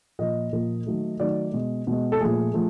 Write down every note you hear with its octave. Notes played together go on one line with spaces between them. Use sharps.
A#2 F3 A#3 D#5
A#2 F3 A#3
D#3 F#3 A3
D#3 F#3 A3 D5
B2 G#3
B2 G#3
A4
A#2 F3 A3 G#4
F3 A3